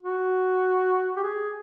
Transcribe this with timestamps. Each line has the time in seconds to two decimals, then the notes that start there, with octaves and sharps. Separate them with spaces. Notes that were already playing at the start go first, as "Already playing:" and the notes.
0.03 F#4
1.16 G4
1.24 G#4